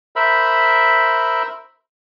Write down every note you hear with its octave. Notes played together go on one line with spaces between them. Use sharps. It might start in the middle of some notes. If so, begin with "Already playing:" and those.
A#4 C5 E5 B5 E6